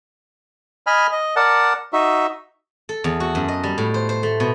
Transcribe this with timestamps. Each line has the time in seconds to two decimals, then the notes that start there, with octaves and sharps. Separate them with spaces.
0.87 D#5 G#5 B5 F6
1.12 D#5
1.36 A#4 D5 F#5 A5
1.93 D#4 F#4 E5
2.89 A4
3.04 E2
3.20 F#4
3.35 F#2
3.48 D#5
3.63 G3
3.78 A2
3.94 C5
4.09 C5
4.23 A3
4.40 B2